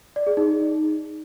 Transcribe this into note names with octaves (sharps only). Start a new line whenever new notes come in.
D5
G#4
D#4